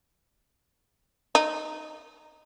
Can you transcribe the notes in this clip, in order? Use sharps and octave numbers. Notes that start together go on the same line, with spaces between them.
D#4